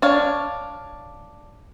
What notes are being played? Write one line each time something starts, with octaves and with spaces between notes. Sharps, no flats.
D4 C#5 F5